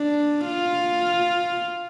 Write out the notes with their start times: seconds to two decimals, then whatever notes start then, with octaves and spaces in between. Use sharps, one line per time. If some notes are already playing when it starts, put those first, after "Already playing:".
Already playing: D4
0.47 F4